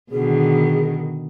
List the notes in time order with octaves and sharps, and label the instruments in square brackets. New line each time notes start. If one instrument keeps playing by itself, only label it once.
[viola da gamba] B2 D3 D#3 [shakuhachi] G#4